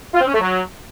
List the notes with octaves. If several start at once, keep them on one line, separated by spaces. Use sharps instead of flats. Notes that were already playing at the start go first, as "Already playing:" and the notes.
F4
C4
C#4
A3
F#3